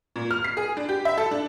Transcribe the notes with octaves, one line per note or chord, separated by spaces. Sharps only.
A#2
F6
C7
G#4
D4
G4
E5
A4
D4